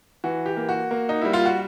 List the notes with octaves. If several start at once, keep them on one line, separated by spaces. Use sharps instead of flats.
E3 F#4
G4
A#3
F#4
A#3
D#4
G3 E4
F4
F#4